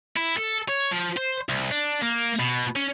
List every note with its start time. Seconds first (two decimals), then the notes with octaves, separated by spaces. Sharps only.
0.16 E4
0.37 A4
0.68 C#5
0.91 F3
1.17 C5
1.49 C2
1.71 D4
2.02 A#3
2.40 B2
2.76 C#4